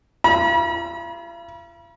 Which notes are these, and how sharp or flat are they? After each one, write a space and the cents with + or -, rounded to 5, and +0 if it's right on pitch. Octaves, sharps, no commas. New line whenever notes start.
F4 -45 B5 -40